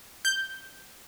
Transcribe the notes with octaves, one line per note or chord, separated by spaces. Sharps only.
G6